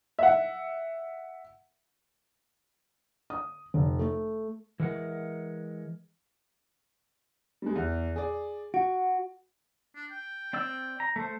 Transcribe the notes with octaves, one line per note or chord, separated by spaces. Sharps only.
E5 F#5
D#6
F1
A3
E3 G#3 A#4 F#5
G3 G#3
E2
G#4 D5
F#4 D7
D4
G5
C4 D5 E6
A#5
A3 C5